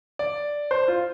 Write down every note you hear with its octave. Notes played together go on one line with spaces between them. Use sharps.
D5
C5
F4